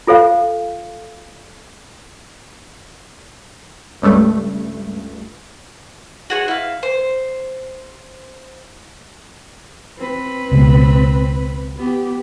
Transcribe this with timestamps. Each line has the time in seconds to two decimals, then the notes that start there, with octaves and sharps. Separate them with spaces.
0.07 F4 A4 C5 F5
4.02 C#2 G2 A3
6.30 F#4 G#4 C#5
6.48 E4 F5
6.83 C5
9.98 C4 B4
10.52 C#2 B2
11.77 B3 G4